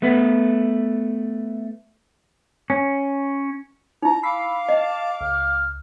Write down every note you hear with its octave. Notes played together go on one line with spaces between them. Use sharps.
A3 B3 B4
C#4
D#4 E4 A#5
F5 B5 D6 E6 B6 C7
D#5 A5 C7
C#2 F6